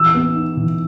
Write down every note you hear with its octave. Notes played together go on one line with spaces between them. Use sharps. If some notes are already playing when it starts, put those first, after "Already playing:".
Already playing: E3 E6
B3
D#4
E3